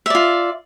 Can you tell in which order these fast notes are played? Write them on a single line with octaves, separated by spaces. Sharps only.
E5 D5 F4